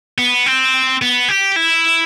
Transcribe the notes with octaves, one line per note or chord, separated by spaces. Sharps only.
B3
C4
B3
G4
E4